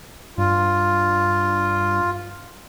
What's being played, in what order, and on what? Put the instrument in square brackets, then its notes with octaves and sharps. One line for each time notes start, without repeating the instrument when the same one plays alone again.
[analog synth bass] G2 [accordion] F4